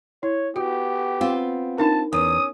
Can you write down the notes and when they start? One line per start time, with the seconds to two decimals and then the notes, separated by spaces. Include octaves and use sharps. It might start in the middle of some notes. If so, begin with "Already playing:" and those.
0.23 E4 C#5
0.56 B3 F#4 G4
1.21 C4 F4
1.78 D4 D#4 A#4 A5
2.13 E2 C#4 A#4 D#6